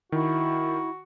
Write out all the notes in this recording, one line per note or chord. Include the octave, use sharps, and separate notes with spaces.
D#3 E4 F#4